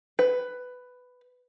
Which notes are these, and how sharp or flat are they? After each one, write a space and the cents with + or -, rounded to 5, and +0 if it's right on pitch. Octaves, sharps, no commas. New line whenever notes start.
B4 +10